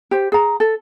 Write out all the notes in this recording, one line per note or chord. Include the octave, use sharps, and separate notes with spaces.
G4 C5
G#4 A#5
A4